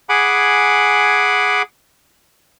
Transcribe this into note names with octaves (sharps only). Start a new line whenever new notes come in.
G#4 F#5 G#5 B5 D6